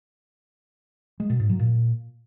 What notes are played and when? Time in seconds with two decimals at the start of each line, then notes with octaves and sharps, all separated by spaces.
1.20 G#3
1.30 B2
1.40 G#2
1.50 F#3
1.59 A#2